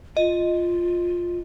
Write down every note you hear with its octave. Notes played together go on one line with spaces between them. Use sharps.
F4 D#5